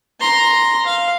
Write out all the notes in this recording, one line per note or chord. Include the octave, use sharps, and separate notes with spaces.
A#5 C6
F5